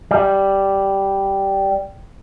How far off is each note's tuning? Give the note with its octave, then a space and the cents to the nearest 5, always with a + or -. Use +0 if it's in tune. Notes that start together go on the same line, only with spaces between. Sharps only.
G3 -5